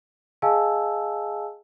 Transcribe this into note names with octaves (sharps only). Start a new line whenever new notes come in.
G#4 D#5 F5 G#5 A5 E6